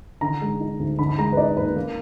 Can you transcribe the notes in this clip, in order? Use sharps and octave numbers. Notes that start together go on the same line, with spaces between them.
D3 A#5
G#3
D#4
D2
D3 B5
B5
G#3 A#5
B4
D#4 D5
D#2 B4
A#3